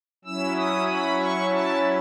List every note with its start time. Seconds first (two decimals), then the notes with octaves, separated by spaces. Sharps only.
0.25 F#3 C#4 E4 E6
0.56 D#6
0.88 B5
1.18 C#6
1.50 A5